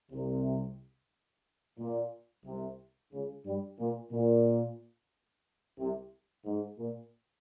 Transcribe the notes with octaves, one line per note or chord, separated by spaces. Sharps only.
C2 C3
A#2
C2 C3
C#2 C#3
G2 G3
A#2
A#2
C2 C3
G#2
A#2